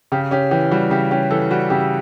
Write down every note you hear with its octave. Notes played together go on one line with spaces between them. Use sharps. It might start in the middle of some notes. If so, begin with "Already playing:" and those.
C#3 G4
C#4 G4
E3 G4
G3 F#4
C#3 G4
C#4 G4
E3 A4
G3 F#4
C#3 G4